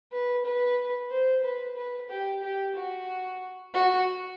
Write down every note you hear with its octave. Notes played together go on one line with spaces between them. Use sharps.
B4
B4
C5
B4
B4
G4
G4
F#4
F#4